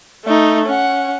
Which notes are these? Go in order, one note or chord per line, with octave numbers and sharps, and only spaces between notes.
A3 D#4
C#4 F#5